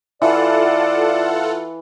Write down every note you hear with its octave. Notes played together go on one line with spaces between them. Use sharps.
E3 F4 A4 D5 F#5